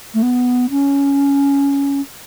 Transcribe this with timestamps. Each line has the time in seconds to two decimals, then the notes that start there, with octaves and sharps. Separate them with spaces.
0.14 A3
0.22 B3
0.70 C#4